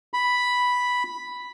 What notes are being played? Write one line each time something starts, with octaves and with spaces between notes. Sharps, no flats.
B5